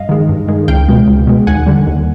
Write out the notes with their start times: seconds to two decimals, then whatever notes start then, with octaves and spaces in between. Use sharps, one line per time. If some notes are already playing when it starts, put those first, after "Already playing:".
Already playing: G2 D#5 F5
0.09 D#3 G#3
0.29 G2
0.48 D#3 G#3
0.68 C#2 F5 G5
0.88 B2 G#3
1.08 C#2
1.27 B2 G#3
1.47 D#2 F#5 G#5
1.66 D3 G3
1.87 D#2